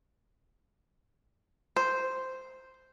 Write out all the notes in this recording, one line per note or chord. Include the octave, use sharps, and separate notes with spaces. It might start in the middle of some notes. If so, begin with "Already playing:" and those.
C5